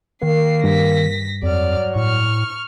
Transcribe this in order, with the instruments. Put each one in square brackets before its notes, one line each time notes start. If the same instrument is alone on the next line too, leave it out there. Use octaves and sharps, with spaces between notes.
[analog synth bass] D#3 [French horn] A#3 [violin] C7
[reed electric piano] G2 [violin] A#6 B6
[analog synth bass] F2 [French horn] F#3 [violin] D5 F6
[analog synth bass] A2 [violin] C#6 F6